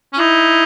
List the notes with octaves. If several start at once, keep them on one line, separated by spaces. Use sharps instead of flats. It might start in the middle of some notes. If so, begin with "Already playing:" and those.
C#4
D#4 E4